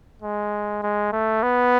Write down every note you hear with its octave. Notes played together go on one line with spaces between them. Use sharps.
G#3
G#3
A3
B3